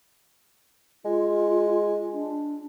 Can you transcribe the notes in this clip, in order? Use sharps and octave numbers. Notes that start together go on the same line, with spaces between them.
G#3 F4
D4